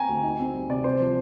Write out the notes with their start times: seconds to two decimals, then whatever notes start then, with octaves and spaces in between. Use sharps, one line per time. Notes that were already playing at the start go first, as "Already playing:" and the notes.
Already playing: C4 G5 G#5 A#5
0.09 D2
0.23 D#4
0.40 C4
0.54 G3
0.69 C3 D5
0.84 C4 C5
1.00 F3